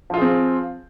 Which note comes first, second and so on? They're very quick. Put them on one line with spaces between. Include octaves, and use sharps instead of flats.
F3 F4 G#4 C4